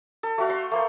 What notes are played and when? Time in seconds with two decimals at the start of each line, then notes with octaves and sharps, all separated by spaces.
0.23 A4
0.38 A3 F#4 F5
0.49 F5 C6
0.71 A3 A#3 C5